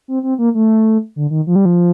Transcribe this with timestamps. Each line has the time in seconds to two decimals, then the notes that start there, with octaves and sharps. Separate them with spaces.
0.08 C4
0.23 C4
0.39 A#3
0.55 A3
1.16 D3
1.30 D#3
1.47 F3
1.56 G3
1.65 F3